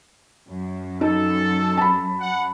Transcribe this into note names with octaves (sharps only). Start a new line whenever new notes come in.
F#2
D#4 A4
A5 B5
F#5